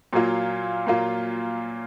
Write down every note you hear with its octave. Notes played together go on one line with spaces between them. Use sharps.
A#2 F#3 A#3 F4
A#2 F#3 A#3 F4